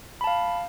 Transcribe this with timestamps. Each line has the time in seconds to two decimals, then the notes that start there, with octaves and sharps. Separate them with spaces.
0.21 B5
0.24 A5
0.27 F5